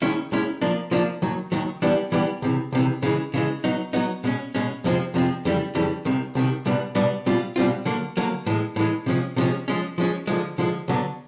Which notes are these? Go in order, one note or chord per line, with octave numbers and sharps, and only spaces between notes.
D#2 D#3 G#3 C#4 E4
D#2 D#3 G#3 C#4 E4
F3 A#3 D4
F3 A#3 D4
D#2 D#3 F#3
D#2 D#3 F#3
E3 G3 B3 D4 G4
E3 G3 B3 D4 G4
C#2 C3 E3
C#2 C3 E3
C#3 E3 G#3
C#3 E3 G#3
F#3 B3 D#4
F#3 B3 D#4
B2 G#3 C#4
B2 G#3 C#4
F2 C3 F3 G#3 C4
F2 C3 F3 G#3 C4
F2 C#3 E3 G3
F2 C#3 E3 G3
C2 C3 D#3
C2 C3 D#3
C2 B2 G3 B3 D4
C2 B2 G3 B3 D4
B2 G3 C4 F4
B2 G3 C4 F4
D3 F#3 A#3
D3 F#3 A#3
A2 E3 G#3
A2 E3 G#3
C3 F3 G#3 C#4
C3 F3 G#3 C#4
F3 G#3 C#4
F3 G#3 C#4
D3 F3 G#3
D3 F3 G#3
D2 D3 F#3 B3